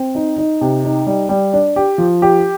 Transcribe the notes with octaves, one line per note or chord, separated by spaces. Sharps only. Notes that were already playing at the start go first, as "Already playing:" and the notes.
Already playing: C4
D#4
D#4
C3
D#4
G3
G3
D4
G4
F3
G4